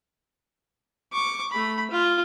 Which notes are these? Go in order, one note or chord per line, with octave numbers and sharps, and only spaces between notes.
C#6 D6
A3 B5
F4